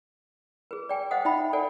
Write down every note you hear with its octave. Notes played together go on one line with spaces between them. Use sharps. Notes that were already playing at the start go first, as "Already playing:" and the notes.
G#4 B4
D5 G5 G#5
C5 D#5 F5 F#5 D#6
D#4 E5 G5 B5
A4 D5 F#5 G#5